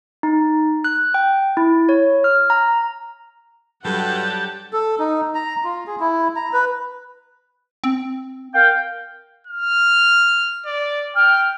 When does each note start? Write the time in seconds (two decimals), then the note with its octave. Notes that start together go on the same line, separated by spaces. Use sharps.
0.23 D#4
0.84 F#6
1.14 G5
1.57 E4
1.89 C#5
2.24 F6
2.50 A#5
3.85 G2 F#3 G3 G4 A4 F#5 A5
4.73 A4
4.99 D#4
5.35 A#5
5.64 F4
5.87 G#4
6.00 E4
6.36 A#5
6.53 B4
7.84 C4
8.54 A#4 F5 G5
9.47 F6
10.66 D5
11.16 G5 F6